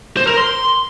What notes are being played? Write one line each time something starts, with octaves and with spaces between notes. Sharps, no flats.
C5
A#4
C6